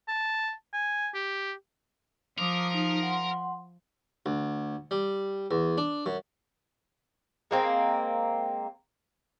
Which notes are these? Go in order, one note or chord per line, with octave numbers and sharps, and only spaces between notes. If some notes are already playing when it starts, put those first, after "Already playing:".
A5
G#5
G4
F3 A#4 D6 D#6
D#4
F#5 C6
D2
G3
E2
D4
F#2
G#3 A#3 C4